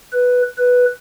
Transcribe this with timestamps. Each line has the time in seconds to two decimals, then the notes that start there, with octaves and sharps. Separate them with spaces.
0.12 B4
0.58 B4